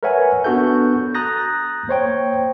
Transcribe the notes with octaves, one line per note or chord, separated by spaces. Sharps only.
A#4 B4 C#5 E5 F#5 G#5
B3 D4 F#4 A4 G6
A#5 D#6 F#6 G6 A6 A#6
A#3 C5 C#5 G5